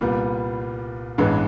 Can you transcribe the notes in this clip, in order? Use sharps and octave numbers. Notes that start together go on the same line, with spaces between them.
C2 A#2 G3 B3
A1 G2 E3 G#3 B3